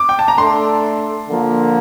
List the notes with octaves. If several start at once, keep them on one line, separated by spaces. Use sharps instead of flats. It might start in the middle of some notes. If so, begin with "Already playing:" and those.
Already playing: D6
G5
A5
A#5
A3 D4 A4 C6
D3 F3 A#3